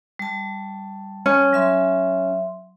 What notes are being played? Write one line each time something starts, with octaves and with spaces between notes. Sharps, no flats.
G3 A5
C#4
F#3 E5 C6